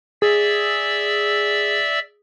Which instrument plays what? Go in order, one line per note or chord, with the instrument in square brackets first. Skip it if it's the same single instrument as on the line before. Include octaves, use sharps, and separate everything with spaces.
[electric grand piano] G#4 [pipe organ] D5 E5 E6